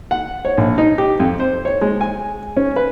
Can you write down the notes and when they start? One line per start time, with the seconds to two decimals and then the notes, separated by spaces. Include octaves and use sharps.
0.11 F#5
0.45 C#5
0.57 A#1
0.78 D#4
0.98 G4
1.20 F2
1.40 C5
1.65 C#5
1.81 G#3
2.01 G#5
2.57 C#4
2.76 B4